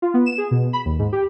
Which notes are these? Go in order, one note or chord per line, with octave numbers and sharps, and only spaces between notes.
F4
B3
E7
G#4
B2
B5
D#2
G#2
G4